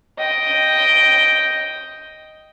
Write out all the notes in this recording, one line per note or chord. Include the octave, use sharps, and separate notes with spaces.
D#5 G5